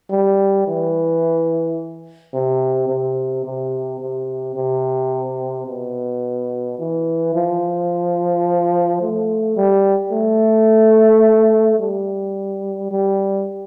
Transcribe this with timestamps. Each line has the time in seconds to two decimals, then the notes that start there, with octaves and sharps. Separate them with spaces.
0.10 G3
0.67 E3
2.34 C3
2.89 C3
3.45 C3
4.01 C3
4.56 C3
5.67 B2
6.79 E3
7.35 F3
9.01 A3
9.57 G3
10.12 A3
11.79 G3
12.91 G3